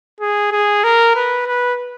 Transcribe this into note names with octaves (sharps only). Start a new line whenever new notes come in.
G#4
G#4
A#4
B4
B4